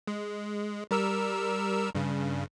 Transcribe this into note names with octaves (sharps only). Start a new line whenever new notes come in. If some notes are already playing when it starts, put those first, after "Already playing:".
G#3
G3 A#4 E6
G2 C#3